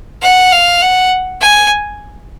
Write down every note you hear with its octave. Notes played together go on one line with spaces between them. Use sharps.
F#5
F5
F#5
G#5